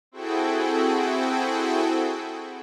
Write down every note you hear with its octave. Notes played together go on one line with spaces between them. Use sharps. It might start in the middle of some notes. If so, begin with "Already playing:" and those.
C4 E4 F#4 G#4 A4 G5